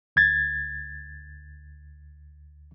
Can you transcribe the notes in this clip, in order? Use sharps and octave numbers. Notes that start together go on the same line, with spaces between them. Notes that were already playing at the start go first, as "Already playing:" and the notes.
D2 G#6 A6